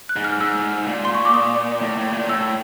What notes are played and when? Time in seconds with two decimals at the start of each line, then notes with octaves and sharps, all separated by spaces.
0.09 F#6
0.16 G#2
0.24 F6
0.40 G#2 E6
0.88 A#2
1.05 C6
1.15 C#6
1.25 D6
1.34 D#6
1.82 A2
1.97 A2
2.13 A#2
2.29 A2 E6